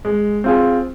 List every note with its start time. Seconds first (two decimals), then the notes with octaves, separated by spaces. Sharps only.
0.05 G#3
0.44 C4 F4 G#4